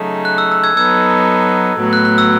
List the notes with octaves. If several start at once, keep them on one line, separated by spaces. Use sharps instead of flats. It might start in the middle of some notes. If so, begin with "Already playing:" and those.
Already playing: C#3 F#3 A3 D#4
F#6
E6
E6
E6 G#6
F#3 B3 D#4 A4 E6 G#6
A2 F#3 B3
F#6
F#6
E6